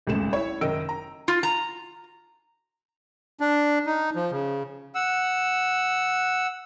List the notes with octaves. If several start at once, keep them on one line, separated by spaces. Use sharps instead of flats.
D#1 G#1 C#2 A3 E7
E4 C#5
F#1 D#3 A#4 D#5 E6 D7
A#5
F4
A#5
D4
D#4
F3
C#3
F#5 E6